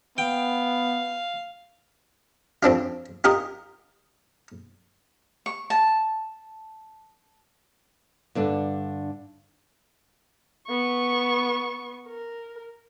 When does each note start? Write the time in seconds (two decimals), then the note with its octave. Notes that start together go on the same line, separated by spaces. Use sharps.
0.18 B3 F5 G5
2.63 F2 C4 D4 F4
3.24 F4 G4 A#4 D#5
5.46 C#6
5.70 A5
8.35 G2 D3 D4
10.67 B3 C#6
12.07 A#4